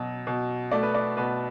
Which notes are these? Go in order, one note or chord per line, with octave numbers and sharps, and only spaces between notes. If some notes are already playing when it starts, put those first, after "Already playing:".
Already playing: B2 F#3
B2
A3 D5
B4
D5
B2 B4